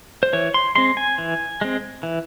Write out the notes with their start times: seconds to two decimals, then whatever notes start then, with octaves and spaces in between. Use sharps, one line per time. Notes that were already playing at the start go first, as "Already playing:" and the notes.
0.23 C5
0.33 E3 C#5
0.54 C6
0.76 G#3 C4 C6
0.97 G#5
1.18 E3
1.61 G#3 C4
2.03 E3